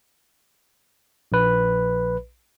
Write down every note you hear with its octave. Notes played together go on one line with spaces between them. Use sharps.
A#1 B4